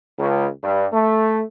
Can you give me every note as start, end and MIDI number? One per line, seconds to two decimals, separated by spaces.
0.19 0.48 37
0.63 0.86 43
0.93 1.43 57